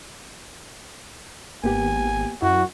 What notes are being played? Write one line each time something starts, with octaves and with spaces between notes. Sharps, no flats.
G#1 A#3 B3 G4 G#5
F#2 E4 F#4